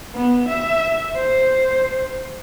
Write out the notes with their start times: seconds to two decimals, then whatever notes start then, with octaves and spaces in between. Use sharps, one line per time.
0.14 B3
0.48 E5
1.15 C5